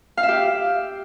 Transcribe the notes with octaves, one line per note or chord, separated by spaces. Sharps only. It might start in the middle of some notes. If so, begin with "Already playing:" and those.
F5
E5
G4